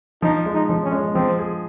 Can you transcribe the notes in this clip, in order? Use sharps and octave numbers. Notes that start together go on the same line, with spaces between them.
F3 D#4
G#3
D#4
F3
C#4
G#3
F3 C4
G#4